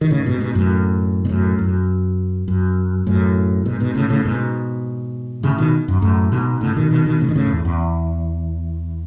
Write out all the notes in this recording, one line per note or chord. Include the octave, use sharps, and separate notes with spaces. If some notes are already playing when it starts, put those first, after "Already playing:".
D#3
A2 C#3
G#2 B2
G#2 B2
F#2 A2
B2
F#2 A2
F#2
F#2
F#2 A2
G#2 B2
G#2 B2
A2 C#3
A2 C#3
G#2 B2
A2 C#3
B2 D#3
F#2
F#2 A2
G#2 B2
A2 C#3
B2 D#3
B2 D#3
B2 D#3
A2 C#3
D#3
A2 C#3
F#2
E2
E2